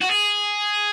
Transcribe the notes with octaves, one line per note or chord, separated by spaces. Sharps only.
F#4
G#4